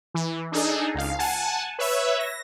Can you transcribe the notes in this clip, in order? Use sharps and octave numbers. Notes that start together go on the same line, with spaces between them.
E3
D4 D#4 G#4 A4
C#2 F5
F#5 G#5 A5
B4 C#5 E5
A#6